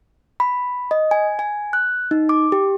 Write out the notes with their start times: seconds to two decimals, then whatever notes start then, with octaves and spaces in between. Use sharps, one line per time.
0.40 B5
0.91 D#5
1.11 G#5
1.39 G#5
1.73 F#6
2.11 D#4
2.29 D6
2.52 G4